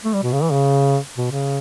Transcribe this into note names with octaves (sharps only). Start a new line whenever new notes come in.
A3
G3
B2
C#3
E3
C#3
B2
C#3